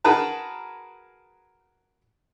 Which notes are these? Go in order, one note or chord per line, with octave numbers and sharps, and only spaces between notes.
F#4 G#4 A#4 B4 A5